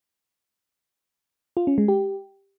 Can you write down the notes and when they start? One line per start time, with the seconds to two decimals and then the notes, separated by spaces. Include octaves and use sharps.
1.57 F4
1.67 C#4
1.78 G#3
1.88 G4